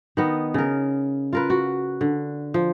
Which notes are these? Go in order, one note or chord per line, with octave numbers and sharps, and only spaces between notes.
D#3 B3 D#5
C#3 A#4
F4 A#4 B4
F#4
D3
F3